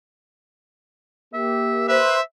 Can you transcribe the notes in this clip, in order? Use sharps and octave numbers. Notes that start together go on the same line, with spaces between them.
A#3 G4 E5
B4 C5 E5